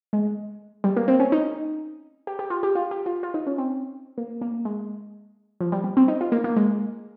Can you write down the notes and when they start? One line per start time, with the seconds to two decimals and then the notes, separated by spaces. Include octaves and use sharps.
0.13 G#3
0.84 G3
0.96 A#3
1.08 C4
1.20 C#4
1.32 D#4
2.27 G4
2.39 G4
2.50 F4
2.63 G4
2.75 F4
2.91 G4
3.06 F4
3.23 F4
3.34 D#4
3.47 C#4
3.58 C4
4.18 A#3
4.41 A#3
4.65 G#3
5.61 F3
5.72 G3
5.84 G3
5.97 C4
6.08 D#4
6.21 F4
6.32 A#3
6.44 A#3
6.57 G#3